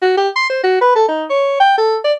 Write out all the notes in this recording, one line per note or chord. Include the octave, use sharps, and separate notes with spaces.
F#4
G4
C6
C5
F#4
B4
A4
D#4
C#5
G5
A4
D5